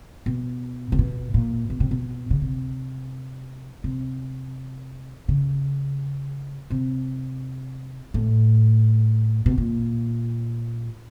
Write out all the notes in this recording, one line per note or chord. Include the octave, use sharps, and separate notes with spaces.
B2
C3
B2
A#2
B2
C3
B2
C#3
C3
C3
C#3
C3
A2
B2
A#2